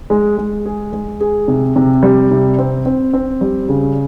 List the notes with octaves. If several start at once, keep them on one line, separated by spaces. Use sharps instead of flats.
G#3
G#3
G#4
G#3
G#4
C3
C3
G3
C3
C4
C4
C4
G3
C#3